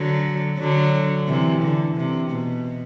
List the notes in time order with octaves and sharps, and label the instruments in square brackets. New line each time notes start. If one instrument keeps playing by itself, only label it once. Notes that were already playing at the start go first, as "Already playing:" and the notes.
Already playing: [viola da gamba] D3 F#3
D3 F#3
C3 E3
D3
C3
B2